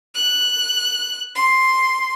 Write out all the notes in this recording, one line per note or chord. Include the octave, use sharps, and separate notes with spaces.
F#6
C6